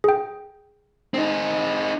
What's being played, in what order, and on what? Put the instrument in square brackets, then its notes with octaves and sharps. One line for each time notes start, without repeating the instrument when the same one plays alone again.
[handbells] G#4 G5
[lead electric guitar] C4 D#4